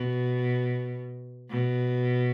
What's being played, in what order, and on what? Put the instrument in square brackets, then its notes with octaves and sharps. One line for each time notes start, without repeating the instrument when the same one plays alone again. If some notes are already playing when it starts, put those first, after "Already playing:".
Already playing: [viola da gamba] B2
B2